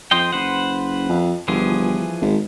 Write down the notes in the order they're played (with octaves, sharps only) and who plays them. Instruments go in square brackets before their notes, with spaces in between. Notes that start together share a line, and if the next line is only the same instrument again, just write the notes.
[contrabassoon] F2 [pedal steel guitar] C5 D#5 G5
[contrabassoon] F#1 [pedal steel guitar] B4 C5 F#5
[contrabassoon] F2
[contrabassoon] G1 [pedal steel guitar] E3 F3 G#4
[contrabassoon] G#1